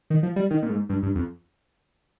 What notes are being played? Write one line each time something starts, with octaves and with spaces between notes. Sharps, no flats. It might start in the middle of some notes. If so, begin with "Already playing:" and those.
D#3
F3
G3
D#3
A#2
G#2
G2
G2
F2